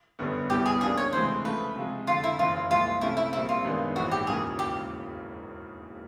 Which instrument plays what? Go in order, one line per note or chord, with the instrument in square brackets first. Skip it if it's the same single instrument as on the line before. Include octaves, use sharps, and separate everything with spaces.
[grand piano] G1 F#2 D3 G3 B3
[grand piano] C2 B2 G3 B3 E4 [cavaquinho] G4
[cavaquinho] G#4
[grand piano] C#3 F3 A#3 D4 G4 [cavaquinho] G#4
[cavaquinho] C#5
[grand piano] D2 C3 E3 G#3 [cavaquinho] C5
[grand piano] C#3 F3 A3 [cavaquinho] B4
[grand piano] C3 F3 G#3
[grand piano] F2 D3 F3 [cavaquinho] F4
[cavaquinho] E4
[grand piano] F#1 F#2 C#3 E3 [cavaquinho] F4
[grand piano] C2 A#2 F3 G#3 [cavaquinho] F4
[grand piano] C3 F3 A3 C#4 [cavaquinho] E4
[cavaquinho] E4
[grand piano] A#1 A#2 G3 C4 [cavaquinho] E4
[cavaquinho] F4
[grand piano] F#2 D#3 G#3 B3 D4
[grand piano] A#1 G#2 E3 [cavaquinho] F#4
[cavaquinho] G4
[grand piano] E1 D#2 C#3 F#3 A#3 [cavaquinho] G#4
[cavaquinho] G4